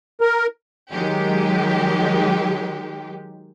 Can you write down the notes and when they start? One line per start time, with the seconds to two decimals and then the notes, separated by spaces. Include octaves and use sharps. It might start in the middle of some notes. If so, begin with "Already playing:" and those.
0.21 A#4
0.92 D#3 F#3 G#3 G4